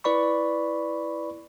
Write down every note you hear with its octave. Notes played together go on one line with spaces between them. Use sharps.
E4 B4 D5 B5 C#6